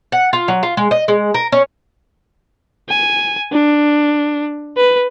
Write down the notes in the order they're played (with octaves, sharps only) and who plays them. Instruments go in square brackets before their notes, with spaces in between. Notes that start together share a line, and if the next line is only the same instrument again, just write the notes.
[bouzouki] F#5
F4
F#3
F4
G#3
D#5
G#3
A#4
C#4
[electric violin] G#5
D4
B4